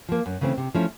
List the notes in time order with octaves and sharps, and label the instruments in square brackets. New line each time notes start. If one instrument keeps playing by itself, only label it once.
[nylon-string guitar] F3 A#3
F#2
C#3 E3 A3 C4
C3
F3 A3 C#4 E4